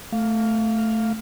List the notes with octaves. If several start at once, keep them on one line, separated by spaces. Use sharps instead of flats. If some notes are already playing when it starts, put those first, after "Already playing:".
A3 F5